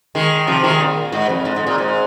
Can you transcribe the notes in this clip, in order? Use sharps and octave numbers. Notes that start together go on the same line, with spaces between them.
D#3 G#3
C3 F3
D#3 G#3
A#2
G#2
F2
G#2
G#2
A#2
G#2